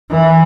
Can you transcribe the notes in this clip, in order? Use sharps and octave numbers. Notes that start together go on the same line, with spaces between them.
E3